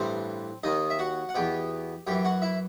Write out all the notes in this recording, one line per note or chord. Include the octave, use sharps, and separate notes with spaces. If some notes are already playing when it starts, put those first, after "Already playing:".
Already playing: A1 G2 E3 C4 C5
D#2 D#3 D#4 D#5
E5
F#4 F#5
F#5
E2 B2 G4 G5
F#2 E3 G4 G5
F#4 F#5
E4 E5